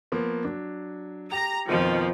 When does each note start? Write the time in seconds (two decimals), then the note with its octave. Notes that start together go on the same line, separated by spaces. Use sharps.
0.12 F3 A#3 B3
0.44 F#3 D4
1.32 G4 A#5
1.69 F2 B2 D#3 F3